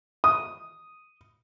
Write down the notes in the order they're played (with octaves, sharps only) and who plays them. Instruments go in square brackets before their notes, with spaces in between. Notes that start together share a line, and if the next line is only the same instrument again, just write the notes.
[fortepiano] D#6